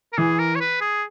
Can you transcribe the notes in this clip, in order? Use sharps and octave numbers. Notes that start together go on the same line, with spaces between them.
A#4
E3 G#4
A#4
C#5
B4
G#4